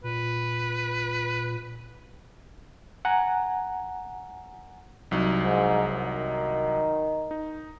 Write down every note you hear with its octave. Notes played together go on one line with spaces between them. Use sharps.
A#2 B4
F#5 G#5 A#5
C2 F#3 D#4
G#2
D#3
D#4